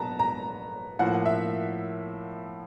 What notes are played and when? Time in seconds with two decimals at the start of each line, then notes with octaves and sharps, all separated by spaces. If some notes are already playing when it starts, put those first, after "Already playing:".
Already playing: F#3 B3 D#4 A5 A#5
0.19 A#5
0.99 A2 F3 A#3 F#5
1.26 E5